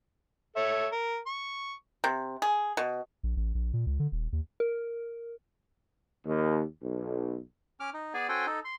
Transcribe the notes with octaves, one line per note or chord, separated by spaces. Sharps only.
A4 C#5 E5
A#4
C#6
C3
G#4
B2
A#1
A1
A#1
A#2
C#2
D3
D#1
D#2
A#4
D#2
B1
C#4 D6 F6
D#4
B3 G#4 D5 G#5
C#4 F#4 A4 C5 G5 G#5
D#4 A4
C6